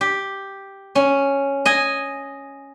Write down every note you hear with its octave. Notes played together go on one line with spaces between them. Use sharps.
G4
C#4
D#5 G#5